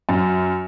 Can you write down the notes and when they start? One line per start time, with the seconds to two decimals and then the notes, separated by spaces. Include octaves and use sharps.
0.09 F#2